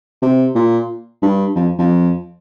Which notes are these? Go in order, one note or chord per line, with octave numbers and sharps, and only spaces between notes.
C3
A#2
G2
F2
F2